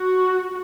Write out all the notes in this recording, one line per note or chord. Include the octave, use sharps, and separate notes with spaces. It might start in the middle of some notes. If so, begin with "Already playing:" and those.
Already playing: F#4